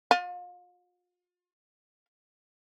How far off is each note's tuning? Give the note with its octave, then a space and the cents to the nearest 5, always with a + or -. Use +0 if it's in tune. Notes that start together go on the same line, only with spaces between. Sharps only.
F4 +40